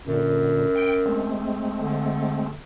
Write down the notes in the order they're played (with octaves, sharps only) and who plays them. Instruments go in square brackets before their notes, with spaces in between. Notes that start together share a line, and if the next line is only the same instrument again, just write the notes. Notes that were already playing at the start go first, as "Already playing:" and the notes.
[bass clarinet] F#2 [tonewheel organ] A#2 D3
[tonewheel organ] G5
G#3 A3 C4
[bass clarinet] D3